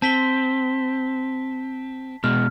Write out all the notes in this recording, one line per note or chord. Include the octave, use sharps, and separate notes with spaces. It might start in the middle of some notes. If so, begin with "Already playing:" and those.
C4 A5 B6 G7
B2 G#3 F6